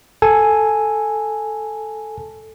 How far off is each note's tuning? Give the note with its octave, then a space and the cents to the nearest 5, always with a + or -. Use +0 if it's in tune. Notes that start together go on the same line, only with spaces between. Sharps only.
A4 +0 G#5 +0